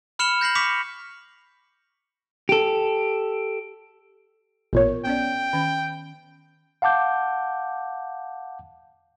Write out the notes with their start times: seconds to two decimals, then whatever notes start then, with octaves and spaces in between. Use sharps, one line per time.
0.19 B5 F6 C#7 E7 F7 G7
0.41 G6 A#6 C7 F#7
0.55 C#6 D6 B6 C#7 F7
2.49 G4 A4
4.73 A1 A#2 B3 A#4 C#5
5.05 B3 C#4 D5 G5
5.53 D#3 C#4 B5
6.82 F5 F#5 A5 D6 G6